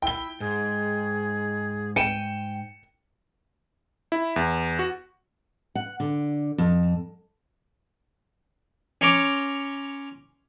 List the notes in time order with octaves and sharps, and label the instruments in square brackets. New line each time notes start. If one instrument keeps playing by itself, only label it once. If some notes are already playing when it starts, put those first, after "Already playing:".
[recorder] E4 [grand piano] G5 G7
[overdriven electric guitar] G#2 [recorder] G#4
[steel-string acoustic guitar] G5 [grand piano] C#7 D#7 E7
[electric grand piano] E4
E2
F#4
[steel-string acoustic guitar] F#5
D3
F2
[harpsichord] C#4 C#5 A#5 C6 D6